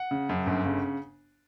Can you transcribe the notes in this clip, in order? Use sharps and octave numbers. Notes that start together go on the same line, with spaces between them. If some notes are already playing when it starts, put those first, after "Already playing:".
Already playing: F#5
C#3
F#2
G1
C#3